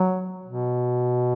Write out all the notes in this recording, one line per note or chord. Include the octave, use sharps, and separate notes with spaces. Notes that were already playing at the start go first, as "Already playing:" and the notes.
Already playing: F#3
B2